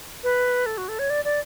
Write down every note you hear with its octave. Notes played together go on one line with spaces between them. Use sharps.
B4
A4
F#4
A4
C#5
D5
D5